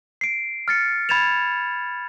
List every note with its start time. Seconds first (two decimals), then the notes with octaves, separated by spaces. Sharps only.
0.21 C7 D7
0.68 F6 A6 C#7
1.09 B5 G#6 A6 E7 F7